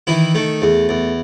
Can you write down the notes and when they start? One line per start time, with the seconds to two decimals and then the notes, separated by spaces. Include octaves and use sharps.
0.07 D#3 E3 E4
0.35 D#3 A3
0.62 E2
0.89 E2